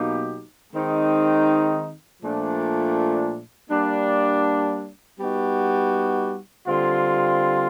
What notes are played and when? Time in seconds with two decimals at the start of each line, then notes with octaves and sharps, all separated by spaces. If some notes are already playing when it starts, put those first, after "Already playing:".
Already playing: B2 F#3 A#3 D#4 G4
0.73 D#3 G#3 C4 D#4
2.22 A#2 F3 A3 D4
3.70 G3 A#3 D4
5.19 G3 B3 D#4 F#4
6.67 D3 G3 C4 F4